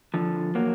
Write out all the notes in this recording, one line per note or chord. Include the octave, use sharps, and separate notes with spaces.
D3 F3
F#3 A#3